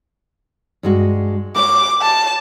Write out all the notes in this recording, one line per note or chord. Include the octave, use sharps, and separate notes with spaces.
G2 G#3 F#4
A#4 C#5 D6
A5